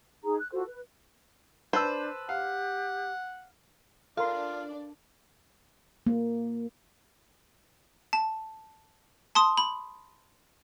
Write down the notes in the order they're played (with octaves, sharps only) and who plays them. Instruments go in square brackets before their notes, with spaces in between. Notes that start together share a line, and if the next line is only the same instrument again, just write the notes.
[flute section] D#4 G#4 A#5
F#6
F4 F#4 A4 C5
B4
[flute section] D4 G6 [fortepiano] B4 A5 E6 [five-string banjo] C5
[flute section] G4 [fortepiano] F5 [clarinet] F#5
[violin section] D4 D5 [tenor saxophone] F4 [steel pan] A4 A#4 C6 [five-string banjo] F5
[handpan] A#3
[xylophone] A5
A5 C6 D#6
B5